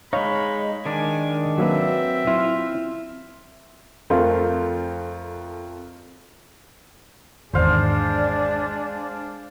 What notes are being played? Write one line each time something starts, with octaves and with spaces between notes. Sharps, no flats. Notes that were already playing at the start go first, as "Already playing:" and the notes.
G#3 D#4 C#5 F5 B5
D#3 G#3 D4 G#5
F#3 A#3 C4 B4 E5
E4 F4
F2 A3 C4 F4 A#4 F5
G#1 E2 D#3 G#3 D4 C5 D5 F5